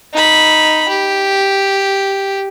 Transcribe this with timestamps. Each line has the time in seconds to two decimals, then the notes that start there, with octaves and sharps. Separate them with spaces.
0.13 D#4 B5
0.89 G4